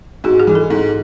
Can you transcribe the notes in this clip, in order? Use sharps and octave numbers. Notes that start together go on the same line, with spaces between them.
G#2 F#4
G#4
E3 G#3
A4
G#2